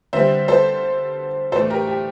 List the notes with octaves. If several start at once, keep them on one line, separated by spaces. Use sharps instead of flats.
D3 G3 C4 C5 E5
A4 C5
A2 E3 A3 D4 A4 C5
G4 A#4
G4